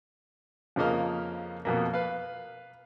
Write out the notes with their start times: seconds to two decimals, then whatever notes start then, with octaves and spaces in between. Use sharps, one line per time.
0.76 F2 C#3 F3 A#3 D#5 F6
1.65 F2 B2 A#3
1.94 B4 F5